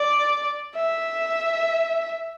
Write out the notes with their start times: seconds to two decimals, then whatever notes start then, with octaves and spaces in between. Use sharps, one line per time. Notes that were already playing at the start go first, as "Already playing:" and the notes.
Already playing: D5
0.75 E5